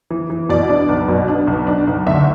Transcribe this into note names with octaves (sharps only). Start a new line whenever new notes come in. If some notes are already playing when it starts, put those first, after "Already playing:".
E3
E3
B2 D5
D4
B1
B2
D4
B1
D4
B1
D2 E5